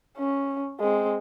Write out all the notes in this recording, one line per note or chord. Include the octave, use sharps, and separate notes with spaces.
C#4
G#3 C4